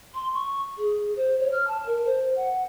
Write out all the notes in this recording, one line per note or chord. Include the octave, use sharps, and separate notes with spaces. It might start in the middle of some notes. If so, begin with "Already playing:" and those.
C6
C#6
G#4
C5
C#5
F6
A5
A#4
C5
F#5